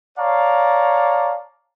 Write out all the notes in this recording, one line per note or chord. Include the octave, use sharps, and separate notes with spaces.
C#5 D5 F5 A5 A#5